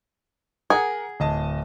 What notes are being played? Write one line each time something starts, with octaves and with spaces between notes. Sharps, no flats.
G#4 A#4 F#5
D1 D#5 A5